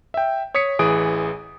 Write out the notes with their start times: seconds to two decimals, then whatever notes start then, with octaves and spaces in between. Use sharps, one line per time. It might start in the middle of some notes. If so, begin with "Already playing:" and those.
0.14 E5 G5
0.54 C#5 D#6 B6 C#7
0.79 A1 E3 G#4 D#6 D7